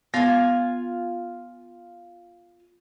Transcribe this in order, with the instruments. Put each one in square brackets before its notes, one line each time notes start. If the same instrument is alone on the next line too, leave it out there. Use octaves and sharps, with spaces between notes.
[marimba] B3 [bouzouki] F4 G#5